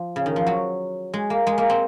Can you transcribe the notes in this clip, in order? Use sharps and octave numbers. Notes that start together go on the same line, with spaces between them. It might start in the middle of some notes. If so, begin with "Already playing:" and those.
Already playing: F3
C#3
D#3
F3
F#3
G#3
A#3
G#3
A#3
C4